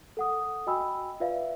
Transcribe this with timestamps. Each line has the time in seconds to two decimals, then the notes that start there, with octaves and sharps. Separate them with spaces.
0.17 A4 F#5 D#6
0.67 F#4 D#5 G5 G#5 B5 E6
1.20 F4 B4 D5 E5 F5